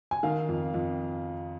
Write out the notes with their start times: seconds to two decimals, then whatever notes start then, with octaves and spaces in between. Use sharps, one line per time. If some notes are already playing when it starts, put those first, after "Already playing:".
0.11 G#5
0.23 D#3 F5
0.49 F2
0.74 F2